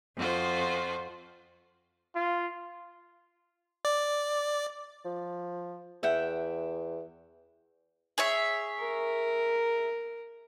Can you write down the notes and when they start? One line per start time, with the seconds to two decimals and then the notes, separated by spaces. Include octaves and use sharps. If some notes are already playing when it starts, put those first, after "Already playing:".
0.17 F2 F4 F#4 C5
2.15 F4
3.85 D5
5.05 F3
6.03 E2 E5 F#5 G5
8.18 G#4 C#5 E5
8.80 A#4